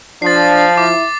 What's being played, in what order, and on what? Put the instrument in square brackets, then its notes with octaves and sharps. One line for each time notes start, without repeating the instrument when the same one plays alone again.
[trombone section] F3 [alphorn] D4 [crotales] A6 C7
[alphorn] E4 [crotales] D6